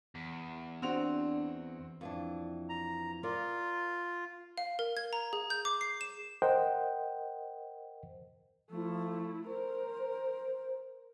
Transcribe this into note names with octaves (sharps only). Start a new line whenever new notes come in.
E2
C4 D4 F#4 F7
F2 E3 D4
A#5
F4 A#4 D5
F5
A#4
G#6
A#5
G#4
G6
D6
C7
E7
A#4 C5 D#5 F#5 G5
F3 A3 E4
A#4 C5